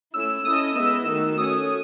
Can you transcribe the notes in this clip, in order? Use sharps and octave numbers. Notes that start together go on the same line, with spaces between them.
A3 C#4 E4 E6
C#4 E4 A4 D#5 D#6
G#3 B3 E4 B4 D#5 E6
D#3 A3 D#4 F#4
A3 C#4 F#4 C#5 D#6